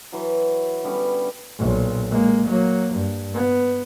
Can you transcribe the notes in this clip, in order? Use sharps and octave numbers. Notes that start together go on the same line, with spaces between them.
E3 F#3
D3 G3 B3 C#4
B1 A#2
G#3 A#3
F#3 A#3
G2
B3